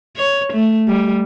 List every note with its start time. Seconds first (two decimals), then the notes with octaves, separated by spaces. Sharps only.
0.16 C#5
0.53 A3
0.88 G3